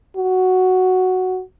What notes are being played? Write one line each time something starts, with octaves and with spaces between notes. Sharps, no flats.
F#4